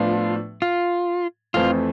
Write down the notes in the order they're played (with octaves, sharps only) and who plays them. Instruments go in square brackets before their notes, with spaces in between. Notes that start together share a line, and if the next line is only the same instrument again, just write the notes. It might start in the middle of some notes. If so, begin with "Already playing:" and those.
Already playing: [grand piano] A2 F3 B3 D4 [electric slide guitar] F4
[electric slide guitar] F4
[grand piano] F2 E3 A3 C4 [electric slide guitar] F4